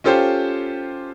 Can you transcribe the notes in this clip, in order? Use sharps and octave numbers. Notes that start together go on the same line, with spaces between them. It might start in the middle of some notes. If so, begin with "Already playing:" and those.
C#4 F4 G4 A4 C5